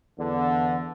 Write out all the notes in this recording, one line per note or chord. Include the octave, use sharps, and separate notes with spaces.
E2 D3